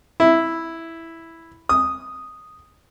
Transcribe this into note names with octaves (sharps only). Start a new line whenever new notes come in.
E4
D#6